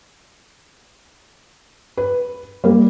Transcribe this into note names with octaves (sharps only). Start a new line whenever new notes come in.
B4
G3 A#3